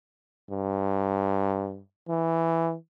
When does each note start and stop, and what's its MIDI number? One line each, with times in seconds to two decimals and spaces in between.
0.50 1.80 43
2.08 2.75 52